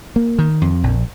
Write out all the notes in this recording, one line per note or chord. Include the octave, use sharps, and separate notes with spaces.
A#3
D#3
F2
A#1